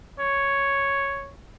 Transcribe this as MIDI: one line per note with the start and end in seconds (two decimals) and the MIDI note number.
0.19 1.30 73